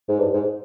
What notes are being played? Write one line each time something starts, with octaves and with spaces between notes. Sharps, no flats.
G#2
G2
G#2